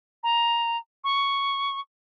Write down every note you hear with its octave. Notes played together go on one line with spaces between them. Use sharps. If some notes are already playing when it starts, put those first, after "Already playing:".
A#5
C#6